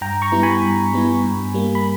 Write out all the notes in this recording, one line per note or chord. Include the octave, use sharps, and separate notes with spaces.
G2 G5 A#5
A#5 C#6
G3 B3 E4
G#5 B5
G2
G3 B3 E4
G2
G3 A#3
B5